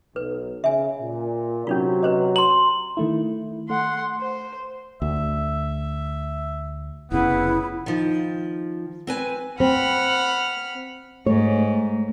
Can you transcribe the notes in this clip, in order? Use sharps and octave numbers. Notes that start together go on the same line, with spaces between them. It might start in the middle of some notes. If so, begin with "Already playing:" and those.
B1 B4
C#3 E5 G#5
A#2
C3 F#3 C#4 D#4 F4
B4 C5 D#5
A#5 C6 F#7
D#3 A3 E4
A3 F#5 C6
C5
D2 E5
F1 C#3 B3 E4
D#3 F3
C4 B4 G#5
C4 F#5 B5 F6
G#2 A3 C#5